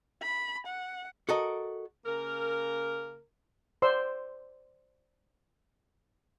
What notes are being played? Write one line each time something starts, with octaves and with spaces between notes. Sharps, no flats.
B5
F#5
F#4 A4 A#4 D#5
C#3 A#3 A#4
C5 D5 C6 E6